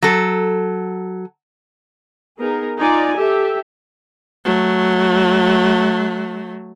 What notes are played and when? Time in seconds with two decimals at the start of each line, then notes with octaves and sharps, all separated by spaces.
0.02 F#3 A4
2.38 B3 D#4 G#4 A#4
2.79 D#4 F4 D5 G#5
3.16 G4 A4 E5
4.45 F#3 A3